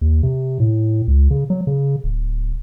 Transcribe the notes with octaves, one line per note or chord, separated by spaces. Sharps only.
D#2
C3
A2
C#2
C#3
F#3
C#3
D1